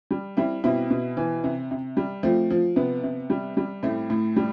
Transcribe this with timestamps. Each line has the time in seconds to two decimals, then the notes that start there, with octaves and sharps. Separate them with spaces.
0.11 G3
0.37 G3 C4 E4
0.64 B2 C4 E4
0.90 B2
1.17 E3
1.44 C3
1.71 C3
1.97 G3
2.23 F3 A3 C4
2.50 F3
2.76 C3 B3
3.03 C3
3.30 G3
3.57 G3
3.83 A2 A3 C4
4.10 A2
4.36 G3